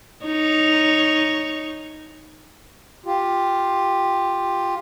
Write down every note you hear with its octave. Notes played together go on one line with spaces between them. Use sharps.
D#4 C#5
F4 G4